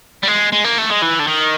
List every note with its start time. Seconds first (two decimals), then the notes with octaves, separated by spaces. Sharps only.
0.23 G3
0.27 G#3
0.52 G#3
0.64 A#3
0.78 A3
0.90 G#3
1.02 E3
1.20 D3
1.27 D#3